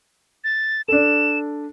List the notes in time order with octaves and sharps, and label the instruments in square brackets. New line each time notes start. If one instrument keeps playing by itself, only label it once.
[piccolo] A6
[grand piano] D4 A4 [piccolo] E7